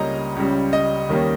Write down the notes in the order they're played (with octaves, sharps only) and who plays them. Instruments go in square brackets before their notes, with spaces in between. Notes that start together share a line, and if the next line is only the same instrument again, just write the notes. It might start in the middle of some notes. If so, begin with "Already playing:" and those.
Already playing: [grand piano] C#2 C#3 G3 A#3 C#4 D#5 A#5
C#2 C#3 G3
D#5
D#2 D#3 G3 A#3 C#4